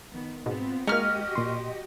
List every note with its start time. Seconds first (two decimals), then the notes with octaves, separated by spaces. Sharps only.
0.11 D#3 B3
0.46 G#2 B2 B3 C4 F4
0.87 G#3 A#3 C#4 D#4 F#4 G4 D#5 F6
1.35 A#2 C6